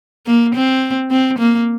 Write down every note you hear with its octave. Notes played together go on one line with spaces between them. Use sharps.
A#3
C4
C4
A#3